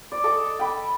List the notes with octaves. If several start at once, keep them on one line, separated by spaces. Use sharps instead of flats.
D5
A4 D#5 D6
G5 B5 D6